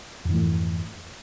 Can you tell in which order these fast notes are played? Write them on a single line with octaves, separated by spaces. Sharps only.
F2 G#2 E3 A3